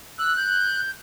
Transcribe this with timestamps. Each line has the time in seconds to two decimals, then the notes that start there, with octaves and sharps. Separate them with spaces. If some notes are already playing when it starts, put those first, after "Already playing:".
0.19 E6 F#6
0.37 G6